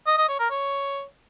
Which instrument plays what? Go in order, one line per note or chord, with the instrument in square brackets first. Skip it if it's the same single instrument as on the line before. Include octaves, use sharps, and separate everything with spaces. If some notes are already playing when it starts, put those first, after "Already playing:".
[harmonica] D#5
D#5
C#5
A#4
C#5